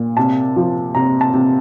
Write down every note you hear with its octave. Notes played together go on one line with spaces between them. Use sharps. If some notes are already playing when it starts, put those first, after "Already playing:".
Already playing: A#2
C3 A5
F3
C3 A#5
A5
C3